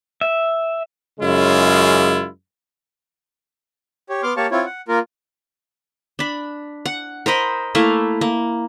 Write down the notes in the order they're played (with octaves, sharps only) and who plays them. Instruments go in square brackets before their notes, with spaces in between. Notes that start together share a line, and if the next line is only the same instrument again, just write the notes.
[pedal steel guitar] E5
[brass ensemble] F#2 C#3 G#3 E4 F4
[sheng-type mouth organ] G4 C#5
B3 C6 D6 F6
A#3 G4 C#5 F5 A5 C#6
C4 E4 F4 C#5
F#5
A#3 F4 A#4
[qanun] D4 B5
F#5
A#4 C5 D#5 B5
A3 A#3 E4 F5
A#3